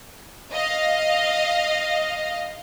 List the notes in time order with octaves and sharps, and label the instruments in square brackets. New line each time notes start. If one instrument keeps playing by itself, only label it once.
[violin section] D#5 F5